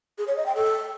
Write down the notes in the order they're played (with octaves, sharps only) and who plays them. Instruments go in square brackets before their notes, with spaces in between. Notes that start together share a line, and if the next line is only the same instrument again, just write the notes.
[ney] G#4
C#5
D#5
G5
A4